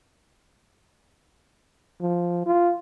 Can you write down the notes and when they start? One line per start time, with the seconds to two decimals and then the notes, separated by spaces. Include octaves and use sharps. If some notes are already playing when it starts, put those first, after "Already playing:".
2.01 F3
2.46 F4